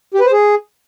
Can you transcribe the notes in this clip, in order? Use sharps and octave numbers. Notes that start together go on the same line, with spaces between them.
G4
B4
C5
G#4